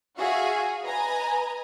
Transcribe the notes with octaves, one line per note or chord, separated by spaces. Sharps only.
F#4 G#4 E5 F5 G#5
B4 D#5 G#5 A#5